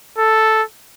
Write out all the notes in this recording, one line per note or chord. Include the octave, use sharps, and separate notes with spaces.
A4